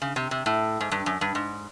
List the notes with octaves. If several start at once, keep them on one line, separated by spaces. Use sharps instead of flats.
C#3
C3
C3
A2
G#2
G2
F#2
G2
G#2